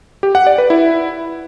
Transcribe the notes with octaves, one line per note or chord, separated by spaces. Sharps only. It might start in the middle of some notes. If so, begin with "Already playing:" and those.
G4
F#5
D5
B4
E4